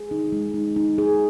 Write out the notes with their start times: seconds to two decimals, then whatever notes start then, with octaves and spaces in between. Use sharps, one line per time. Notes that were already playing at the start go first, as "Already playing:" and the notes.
Already playing: G#4
0.11 D#4
0.32 G#3
0.54 D#4
0.76 D#4
0.98 G#4